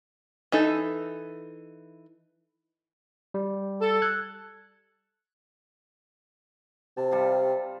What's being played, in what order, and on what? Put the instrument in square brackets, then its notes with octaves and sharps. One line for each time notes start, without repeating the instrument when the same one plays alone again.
[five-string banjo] E3 D#4 A4
[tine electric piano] G3
[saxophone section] A4
[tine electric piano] F#6 G#6
[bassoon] C3 [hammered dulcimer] A5
[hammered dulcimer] G3 F4